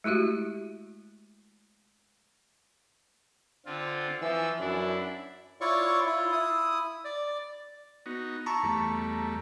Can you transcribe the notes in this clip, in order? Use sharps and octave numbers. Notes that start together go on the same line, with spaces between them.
G#3 A3 E4 F#4 G4
D3 C4 F4
E3 F3 E6
F#2 D4 E4
E4 F4 C#5 D5 C#6
E4 F4
E4 D#6
D5
B3 D#4 F#4
E4 A5 A#5 C#6
E2 G3 A3